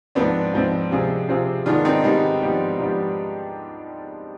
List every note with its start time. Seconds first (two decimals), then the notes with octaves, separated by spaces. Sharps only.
0.15 G#2 F3 B3 C4 D4
0.53 G#2 F3 C4
0.91 C3 F3 C4 F4 G#4
1.29 C3 F3 C4 F4 G#4
1.66 G#2 D#3 B3 D4 D#4 F4 G#4
1.85 C4 D#4
2.04 G#2 D#3 G3 B3 D#4 G#4
2.42 G#2 F3 B3 D4 G4
2.78 G#2 F3 B3 D4 G4